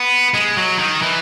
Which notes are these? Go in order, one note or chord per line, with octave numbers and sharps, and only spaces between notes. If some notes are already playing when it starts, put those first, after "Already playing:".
Already playing: B3
G#3
F#3
D#3
E3